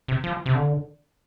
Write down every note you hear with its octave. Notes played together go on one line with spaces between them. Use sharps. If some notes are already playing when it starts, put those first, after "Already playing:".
C3
F3
C3
D3